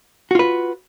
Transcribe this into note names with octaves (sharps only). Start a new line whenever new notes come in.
F4 F#4 B4